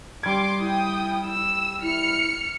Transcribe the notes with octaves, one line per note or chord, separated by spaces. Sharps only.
G3 C6 D6 G#6
E4 G5 D#6
E6
E4 F6 C#7